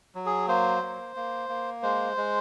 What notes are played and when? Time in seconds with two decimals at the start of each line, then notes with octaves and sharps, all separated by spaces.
0.15 F#3
0.26 G#4
0.48 A#3 C5
0.82 A#3
1.16 A#3
1.49 A#3
1.83 G#3 C5
2.17 G#3